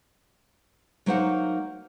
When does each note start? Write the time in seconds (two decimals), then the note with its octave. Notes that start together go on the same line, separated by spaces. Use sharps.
1.06 F#3 A#3 D#4 C5 F5 F#5